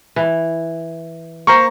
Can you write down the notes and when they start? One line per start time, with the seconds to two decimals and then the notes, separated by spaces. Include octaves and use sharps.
0.16 E3
1.47 A#3 C5 A#5 C#6